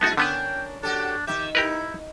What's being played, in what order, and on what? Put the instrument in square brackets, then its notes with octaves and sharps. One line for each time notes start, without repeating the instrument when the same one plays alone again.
[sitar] G#3 E4 G#4 [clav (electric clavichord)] B3 D#4 F#4 [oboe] A5
[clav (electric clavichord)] D3 B3 B4 [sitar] C#4 D4 A#4 [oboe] G5
[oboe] D4 [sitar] F#4 G4 A4
[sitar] D#3 E5 [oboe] G4
[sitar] D#4 [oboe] E4 [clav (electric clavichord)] G4 A#4 B4